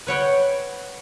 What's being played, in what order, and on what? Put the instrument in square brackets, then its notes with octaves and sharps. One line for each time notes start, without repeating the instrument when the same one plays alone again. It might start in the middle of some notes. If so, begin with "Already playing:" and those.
[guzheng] B4 C#5 F#5 G5